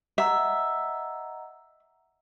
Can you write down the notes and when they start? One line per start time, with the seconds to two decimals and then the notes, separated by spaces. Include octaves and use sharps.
0.18 D#5 E5 F#5 A#5